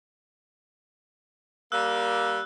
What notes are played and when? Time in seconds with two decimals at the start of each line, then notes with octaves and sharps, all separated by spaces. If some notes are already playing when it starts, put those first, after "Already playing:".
1.72 G3 A#3 E6 F#6